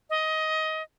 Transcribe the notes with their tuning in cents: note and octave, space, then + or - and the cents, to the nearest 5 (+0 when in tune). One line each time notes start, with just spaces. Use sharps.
D#5 +20